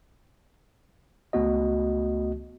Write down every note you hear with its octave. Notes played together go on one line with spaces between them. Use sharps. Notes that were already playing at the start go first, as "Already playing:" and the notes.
C#2 A3 B3 F#4 D#5